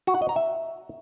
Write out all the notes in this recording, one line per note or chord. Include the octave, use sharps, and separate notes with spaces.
F#4
F#5
D#5
A#5
E5